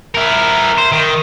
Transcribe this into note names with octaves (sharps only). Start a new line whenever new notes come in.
E4 A#4
C5
D#3